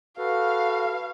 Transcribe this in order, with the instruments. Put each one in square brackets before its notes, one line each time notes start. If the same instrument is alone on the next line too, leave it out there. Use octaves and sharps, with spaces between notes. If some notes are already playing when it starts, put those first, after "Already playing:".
[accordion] F#4 A4 B4 [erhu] F5